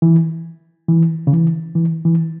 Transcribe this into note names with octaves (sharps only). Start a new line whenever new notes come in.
E3
E3
C#3
E3
E3
E3